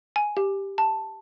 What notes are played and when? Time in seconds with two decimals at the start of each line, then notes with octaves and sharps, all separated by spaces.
0.16 G#5
0.37 G4
0.78 A5